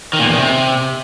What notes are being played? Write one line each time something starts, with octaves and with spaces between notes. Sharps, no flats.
D#3
A#2
E2
D#3
C3